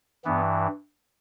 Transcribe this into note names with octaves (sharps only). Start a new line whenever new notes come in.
G2 E3 B3